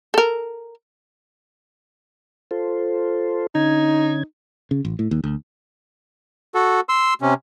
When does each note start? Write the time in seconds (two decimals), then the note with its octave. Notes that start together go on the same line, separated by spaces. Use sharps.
0.14 A4 A#4
2.51 F4 A4 C5
3.55 D3 C#4 D#4 G#6
4.71 C#3
4.85 A1
4.99 A2
5.11 D#2
5.24 D2
6.55 F#4 A4
6.89 C6 E6
7.22 C3 C#4